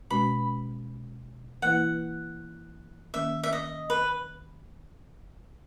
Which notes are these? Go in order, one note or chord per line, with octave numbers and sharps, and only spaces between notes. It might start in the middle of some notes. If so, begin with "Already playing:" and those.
B2 G#3 C#4 F#4 B4 B5
E3 A#3 E4 B4 F#5
D#3 A#3 C#4 E5
E5
D#5
B4